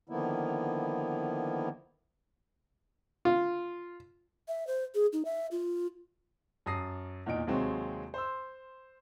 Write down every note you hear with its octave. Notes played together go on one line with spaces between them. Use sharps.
D3 D#3 F3 A#3 B3 E4
F4
E5
C5
G#4
D#4
E5
F4
F#2 A5 D#6 A#6 C7
E2 A#2 D#4 D7
D#2 C3 F#3 G#3 C4
C5 C6 E6